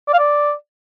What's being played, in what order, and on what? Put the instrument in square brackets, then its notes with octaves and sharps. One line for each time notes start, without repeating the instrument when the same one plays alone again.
[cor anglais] D5
F5
D5